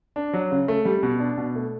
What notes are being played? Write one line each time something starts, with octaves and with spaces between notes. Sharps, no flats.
D4
F#3
C#3
A3
G3
B2
D4
B2
A3